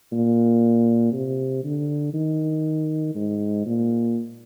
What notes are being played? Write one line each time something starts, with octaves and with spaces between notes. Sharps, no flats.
A#2
C3
D3
D#3
G#2
A#2